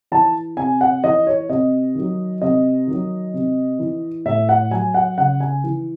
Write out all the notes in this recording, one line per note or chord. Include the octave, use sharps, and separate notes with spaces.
E3 A5
C3 G#5
F#5
E3 D#5
C#5
C3 D#5
D#3 F#3
C3 D#5
D#3 F#3
C3
E3
A2 E5
F#5
F#3 G#5
F#5
C#3 F#5
G#5
E3